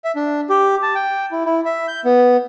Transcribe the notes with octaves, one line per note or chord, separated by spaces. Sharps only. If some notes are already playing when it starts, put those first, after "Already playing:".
E5
D4
G4
A5
G5
E4
E4
E5
G6
B3